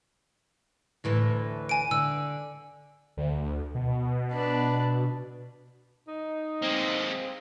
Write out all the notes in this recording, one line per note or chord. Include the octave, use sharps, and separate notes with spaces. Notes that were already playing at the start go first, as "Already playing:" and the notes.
D2 A2 E3
G#5 D7
D3 E6
D2
B2
D4 B4
D#4
G#3 A#3 C4